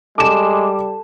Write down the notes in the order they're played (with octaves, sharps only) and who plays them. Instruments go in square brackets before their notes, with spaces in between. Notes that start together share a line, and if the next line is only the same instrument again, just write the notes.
[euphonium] G3 [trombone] G#3 [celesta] A4 A5 [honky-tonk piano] D6 E7